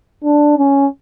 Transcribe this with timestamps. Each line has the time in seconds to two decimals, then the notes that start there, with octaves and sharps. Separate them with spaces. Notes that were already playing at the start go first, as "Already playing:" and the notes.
0.24 D4
0.57 C#4